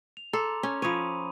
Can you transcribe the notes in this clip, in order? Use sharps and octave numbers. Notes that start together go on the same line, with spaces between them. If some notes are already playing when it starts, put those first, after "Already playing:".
F7
A4 A#5 C6 D6
C#4
F3 C#5 B5 D#6 D#7